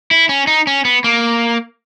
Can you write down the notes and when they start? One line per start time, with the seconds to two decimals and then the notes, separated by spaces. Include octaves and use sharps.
0.11 E4
0.29 C#4
0.47 D#4
0.67 C#4
0.85 B3
1.04 A#3